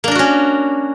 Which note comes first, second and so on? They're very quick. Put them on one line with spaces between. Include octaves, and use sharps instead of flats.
A#3 D4 A#4 F#4 C#4